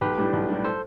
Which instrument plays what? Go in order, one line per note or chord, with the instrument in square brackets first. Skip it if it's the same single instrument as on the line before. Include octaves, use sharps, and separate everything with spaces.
[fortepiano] B1 [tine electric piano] G4 B4
[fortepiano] A2 G3 D4
B1
A2 G3 D4
[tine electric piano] A4 C5